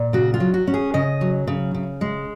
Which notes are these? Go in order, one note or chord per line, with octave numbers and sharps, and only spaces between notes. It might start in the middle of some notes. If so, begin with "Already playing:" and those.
Already playing: A#2
C#3 F#4
F4
F#3
F#4
C#4
G#4
C#3 D#5
F#3
C#3
C#3
G#3